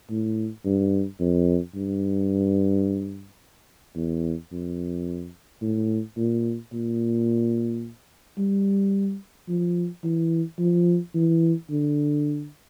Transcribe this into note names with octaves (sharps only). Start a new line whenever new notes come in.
A2
G2
F2
G2
E2
F2
A2
A#2
A#2
G3
F3
E3
F3
E3
D3